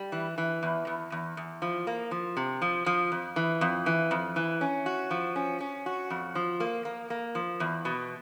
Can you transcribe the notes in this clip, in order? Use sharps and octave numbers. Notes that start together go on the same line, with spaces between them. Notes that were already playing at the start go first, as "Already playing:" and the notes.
Already playing: G3
E3
E3
E2
E2
E2
E2
F3
A#3
F3
C3
F3
F3
F2
E3
F2
E3
F2
E3
C#4
F#4
F3
C#4
C#4
F#4
F2
F3
A#3
A#3
A#3
F3
E2
B2